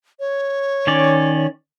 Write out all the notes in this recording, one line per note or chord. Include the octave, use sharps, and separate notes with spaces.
C#5
D#3 C#4 D5